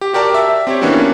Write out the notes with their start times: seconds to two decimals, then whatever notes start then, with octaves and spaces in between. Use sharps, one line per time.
0.01 G4
0.13 F#4 G4 A#4 D5 A5
0.34 E5
0.67 C4 G4 C#5
0.81 E3 A#3 B3 C#4 D4 F#4